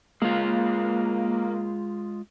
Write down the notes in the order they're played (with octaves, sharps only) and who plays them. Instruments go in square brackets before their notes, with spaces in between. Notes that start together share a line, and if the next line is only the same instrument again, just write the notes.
[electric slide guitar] G#3 F4 [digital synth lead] A#3